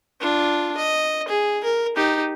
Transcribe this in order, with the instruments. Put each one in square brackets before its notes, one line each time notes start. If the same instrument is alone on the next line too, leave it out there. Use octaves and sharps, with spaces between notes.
[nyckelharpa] D4 F4
D#5
G#4
A#4
D#4 G4